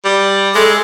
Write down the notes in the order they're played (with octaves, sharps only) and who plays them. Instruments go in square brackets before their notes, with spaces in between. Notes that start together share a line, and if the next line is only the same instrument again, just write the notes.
[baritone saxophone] G3
[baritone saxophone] G#3 [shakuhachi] A4